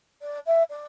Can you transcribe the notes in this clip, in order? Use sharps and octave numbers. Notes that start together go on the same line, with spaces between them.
D5
E5
D5